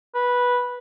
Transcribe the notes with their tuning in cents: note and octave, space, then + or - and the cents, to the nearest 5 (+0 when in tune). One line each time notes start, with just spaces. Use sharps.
B4 -10